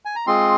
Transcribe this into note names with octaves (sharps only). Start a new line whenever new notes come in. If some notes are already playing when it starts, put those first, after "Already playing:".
G#5
A#5
G#3 C4 F4 G#4 C6